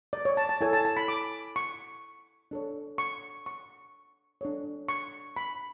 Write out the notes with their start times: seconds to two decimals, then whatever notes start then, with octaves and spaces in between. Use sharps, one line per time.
0.13 D5
0.25 C#5
0.37 A5
0.49 A5
0.61 E4 A4 C#5 G#5
0.73 A5
0.85 A5
0.97 B5
1.08 D6
1.56 C#6
2.51 D4 A4 C#5
2.98 C#6
3.46 C#6
4.41 D4 A4 C#5
4.89 C#6
5.36 B5